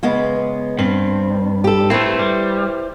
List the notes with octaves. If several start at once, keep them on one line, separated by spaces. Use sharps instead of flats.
C#3 G#3 B3
G2 C4
G4 A4
A3 C4 E4 B4 C5
G3